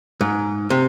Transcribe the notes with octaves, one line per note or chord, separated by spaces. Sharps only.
G#2
C3